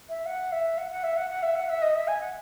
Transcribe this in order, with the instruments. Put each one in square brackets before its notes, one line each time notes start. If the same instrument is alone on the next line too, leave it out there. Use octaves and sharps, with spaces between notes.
[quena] E5
F#5
E5
F#5
F#5
E5
F#5
F#5
E5
F#5
E5
D#5
E5
G#5
F#5